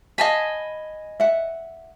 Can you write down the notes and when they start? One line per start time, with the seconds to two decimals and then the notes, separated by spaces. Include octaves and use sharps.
0.18 D#5 F5 G#5 A5 B5
1.20 E5 F#5